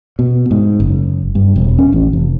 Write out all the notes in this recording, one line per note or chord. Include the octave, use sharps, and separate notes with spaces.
B2
G#2
F#1
G2
E1
C#4
A1
F1